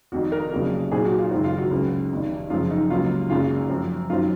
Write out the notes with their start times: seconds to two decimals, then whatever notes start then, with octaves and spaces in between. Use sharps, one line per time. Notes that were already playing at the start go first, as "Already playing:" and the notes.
0.12 F1 F2 D#3 F#4
0.32 A#4
0.52 F1 F2 C#3 F#3 A#3
0.91 C2 A#2 F#3 C4 G#4
1.05 F#4
1.19 F4
1.31 F#1 F#2 D#3 G#3 C4 F4
1.44 F4
1.58 F#4
1.71 C#2 C#3 F#3 C4
2.11 F1 F2 D#3
2.50 F#2 C#3 F3 F4
2.70 D#4
2.90 C#2 C3 F#3 A#3 F4
3.30 G#1 F#2 C#3 F#3 A#3 F4
3.70 F#2 F3 C4
4.10 F#2 D#3 F#3 C4 F4